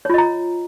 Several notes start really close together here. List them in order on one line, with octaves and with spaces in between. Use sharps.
C#5 F4 D#5 A#5